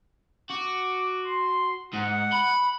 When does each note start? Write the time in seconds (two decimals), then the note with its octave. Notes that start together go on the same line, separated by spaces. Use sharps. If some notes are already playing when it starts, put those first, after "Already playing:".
0.50 F#4 D6
1.26 C6
1.94 G#2 F#5
2.33 B5